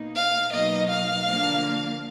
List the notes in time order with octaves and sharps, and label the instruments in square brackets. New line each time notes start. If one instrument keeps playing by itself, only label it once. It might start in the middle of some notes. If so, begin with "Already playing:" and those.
Already playing: [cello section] B2 A#3 D#4
[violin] F5
[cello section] B2 F#3 A#3 D#4 [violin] D#5
[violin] F5
[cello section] D3 F3 A#3 D4